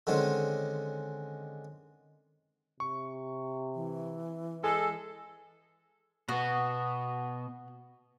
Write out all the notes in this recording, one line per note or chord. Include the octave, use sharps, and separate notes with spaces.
D3 D#3 G#3 C4 C#4
C3 C#6
E3
G#3 A4 G#5
B2 B3 F#4